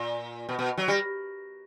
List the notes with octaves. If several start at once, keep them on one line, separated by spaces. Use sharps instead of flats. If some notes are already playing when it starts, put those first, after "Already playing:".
Already playing: A#2
B2
B2
F#3
G3